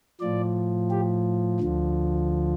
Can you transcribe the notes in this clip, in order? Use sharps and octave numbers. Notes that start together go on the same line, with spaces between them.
A2 F3 D5
G4
D2 D3 F3